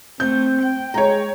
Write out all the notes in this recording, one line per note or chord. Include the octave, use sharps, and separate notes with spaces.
A3 C4 G6
G5
G#3 C#5 A#5